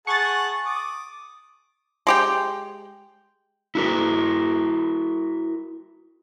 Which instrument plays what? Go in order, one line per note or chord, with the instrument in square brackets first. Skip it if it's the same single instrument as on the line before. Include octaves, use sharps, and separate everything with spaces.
[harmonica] G#4 F#5 A5 [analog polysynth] C#6 A6
[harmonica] D6 D#6
[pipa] G#3 G4 G5
[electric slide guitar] E4 F#4 A#4